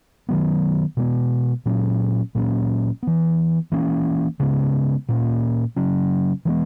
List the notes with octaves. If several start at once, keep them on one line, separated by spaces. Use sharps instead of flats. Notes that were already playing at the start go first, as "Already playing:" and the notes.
D#3 F#3 B3
B2 G#3 B3
A#2 F#3 C#4
A#2 F#3 A#3 C#4
E3 B3
E3 A#3 C#4
C#3 G#3 B3
A#2 A#3 C#4
C#3 F#3 C#4
E3 G#3 B3